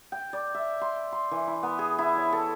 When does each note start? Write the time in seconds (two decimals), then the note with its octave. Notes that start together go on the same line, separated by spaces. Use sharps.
0.12 G5
0.33 D5
0.54 E5
0.81 C6
1.12 C6
1.31 E3
1.47 E4
1.63 B3
1.79 G#4
1.99 E4
2.17 C#5
2.33 A4